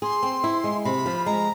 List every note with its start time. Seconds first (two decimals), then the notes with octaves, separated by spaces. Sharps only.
0.02 G#4 C6
0.23 C4
0.44 E4
0.64 G#3
0.85 C3 B5
1.06 F3
1.26 G#3 A#5